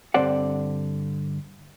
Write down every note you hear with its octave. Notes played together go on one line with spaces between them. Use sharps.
G2 D3 C4 C5 D5 F#5